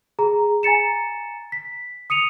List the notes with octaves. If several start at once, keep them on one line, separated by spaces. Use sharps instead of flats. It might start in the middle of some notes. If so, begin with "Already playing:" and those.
G#4 A#5
G#5 A#5 A6 C#7 E7
B6
D#6 C#7 D#7 F7